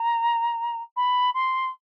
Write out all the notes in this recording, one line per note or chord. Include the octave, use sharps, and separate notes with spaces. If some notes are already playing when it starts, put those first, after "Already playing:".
Already playing: A#5
B5
C6